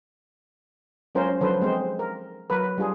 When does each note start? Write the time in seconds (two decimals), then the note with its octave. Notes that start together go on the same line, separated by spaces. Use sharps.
1.15 F#3 G#3 C#4 F4 A#4 C5
1.41 D3 F3 F#3 A4 B4 C5
1.62 G#3 C4 C5
1.99 A#4
2.50 F#3 A#4 B4
2.78 G3 D4 F4 G#4